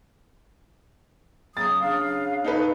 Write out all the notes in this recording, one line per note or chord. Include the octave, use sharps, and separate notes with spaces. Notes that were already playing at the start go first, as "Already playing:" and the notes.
C#3 F#3 D#6 A6
C#3 D4 F5
D#4 A4 B4